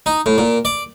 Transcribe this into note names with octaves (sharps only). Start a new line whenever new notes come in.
D#4
A2
A#2
D5